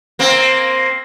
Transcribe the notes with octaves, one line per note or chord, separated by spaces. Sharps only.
A#3 C4